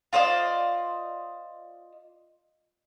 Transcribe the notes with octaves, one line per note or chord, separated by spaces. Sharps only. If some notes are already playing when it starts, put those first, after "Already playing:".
F4 C5 D5 D#5